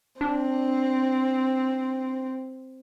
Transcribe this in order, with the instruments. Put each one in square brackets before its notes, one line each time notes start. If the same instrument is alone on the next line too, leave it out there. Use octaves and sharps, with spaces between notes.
[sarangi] C4 [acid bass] D4